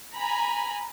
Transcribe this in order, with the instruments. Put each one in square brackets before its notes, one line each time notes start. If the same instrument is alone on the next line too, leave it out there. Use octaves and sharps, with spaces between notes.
[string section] G#5 A#5 B5